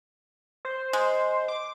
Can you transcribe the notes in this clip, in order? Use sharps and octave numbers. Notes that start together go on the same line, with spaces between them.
C5
G#3
D6